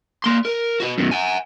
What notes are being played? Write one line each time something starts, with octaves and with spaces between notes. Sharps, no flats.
A#3 C6
A#4
F#4 B4
F#2 B2
F#5 G#5